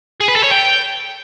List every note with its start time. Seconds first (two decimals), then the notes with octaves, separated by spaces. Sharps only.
0.21 G#4
0.28 B4
0.36 A4
0.43 C#5
0.51 G5